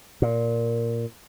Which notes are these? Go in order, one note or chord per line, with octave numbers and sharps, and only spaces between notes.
A#2